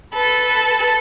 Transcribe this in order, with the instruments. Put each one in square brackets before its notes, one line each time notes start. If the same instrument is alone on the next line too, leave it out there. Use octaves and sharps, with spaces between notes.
[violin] A4 B4